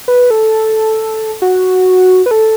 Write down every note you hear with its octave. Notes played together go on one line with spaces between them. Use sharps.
B4
A4
F#4
B4
A4